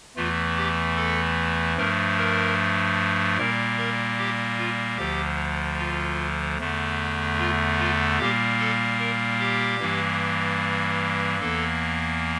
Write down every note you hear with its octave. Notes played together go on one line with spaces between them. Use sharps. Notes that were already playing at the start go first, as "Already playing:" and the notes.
E2 E3 A3 F4
G4
A4
G2 F3 A3 A#4
A#4
A#2 G3 A#3 A#4
A#4
G4
F4
D2 D3 F3 G4
F4
E2 D3 A3
F4
F4
A#2 G3 A#3 G4
A4
A#4
G4
G2 E3 G3 A#3
E2 E3 A#3 A4